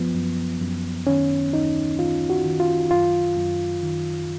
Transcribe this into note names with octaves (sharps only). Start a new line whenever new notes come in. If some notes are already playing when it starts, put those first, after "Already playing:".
Already playing: F#2 F3 B3
F#2
F#2
D#3 C#4
D#2 D#4
D#3 F4
F#4
D#3
F4
F#2 F4
F#2
D#3